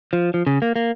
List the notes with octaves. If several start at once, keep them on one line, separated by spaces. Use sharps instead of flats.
F3
F3
C#3
A#3
A#3